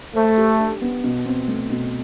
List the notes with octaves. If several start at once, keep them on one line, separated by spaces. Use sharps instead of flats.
A3 C5
G4
D4
B3
B2
C4
A3
B2